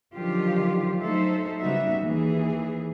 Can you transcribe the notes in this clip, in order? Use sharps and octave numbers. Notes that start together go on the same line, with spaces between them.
D3 D#3 F3 F#3 F4 G4
F#3 A3 D#4 A4 C5 E5
C#3 G3 B3 D#4 F#4 E5
D#2 E3 G#4